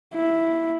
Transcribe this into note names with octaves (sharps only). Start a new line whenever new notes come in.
E4